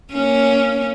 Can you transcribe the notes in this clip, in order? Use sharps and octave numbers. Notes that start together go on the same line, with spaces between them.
A#3 C#4